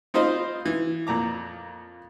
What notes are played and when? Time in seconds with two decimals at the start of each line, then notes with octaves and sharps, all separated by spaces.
0.14 C4 D#4 F4 C5 D#5 B5
0.65 E3
1.07 F2 A#2 A#5 D6